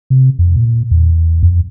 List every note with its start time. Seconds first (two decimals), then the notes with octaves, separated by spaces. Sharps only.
0.10 C3
0.39 F2
0.57 A#2
0.91 E2
1.43 F2